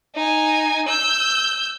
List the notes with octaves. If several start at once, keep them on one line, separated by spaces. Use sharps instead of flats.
D#4 G#5
E6 G6